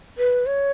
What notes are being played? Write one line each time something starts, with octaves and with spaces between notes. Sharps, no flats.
B4
C#5